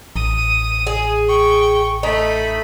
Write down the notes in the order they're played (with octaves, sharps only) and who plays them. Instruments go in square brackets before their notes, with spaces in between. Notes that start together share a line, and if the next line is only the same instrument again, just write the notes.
[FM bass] A1 [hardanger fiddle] D#6
[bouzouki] G#4
[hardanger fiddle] G5 C#6
[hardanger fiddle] A3 B5 [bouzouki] D#4